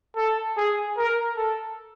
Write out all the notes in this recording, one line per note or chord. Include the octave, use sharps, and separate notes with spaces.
A4
G#4
A#4
A4